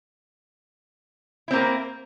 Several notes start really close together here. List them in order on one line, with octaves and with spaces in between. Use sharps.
E4 C4 A#3 A#4